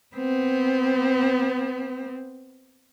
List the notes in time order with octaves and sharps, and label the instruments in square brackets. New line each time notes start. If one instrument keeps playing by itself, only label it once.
[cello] B3 C4